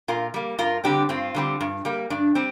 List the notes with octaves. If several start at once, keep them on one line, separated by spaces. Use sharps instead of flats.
A#2 F4 A#4
G3 A#3
G2 F4 A#4
D3 G3 C4 D4 G4
G2 C4 F4
D3 G3 C4
G2
G3 A#3
G2 D4
G3 C4